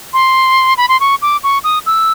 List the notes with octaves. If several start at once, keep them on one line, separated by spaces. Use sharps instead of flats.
C6
B5
C6
C#6
D6
C#6
D#6
E6